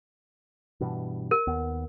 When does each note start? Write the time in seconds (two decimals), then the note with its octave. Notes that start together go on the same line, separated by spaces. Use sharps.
0.81 G2 B2 E3
1.31 A#4
1.47 D#2 B3